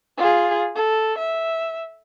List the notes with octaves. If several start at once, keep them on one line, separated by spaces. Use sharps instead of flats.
F4 G#4
A4
E5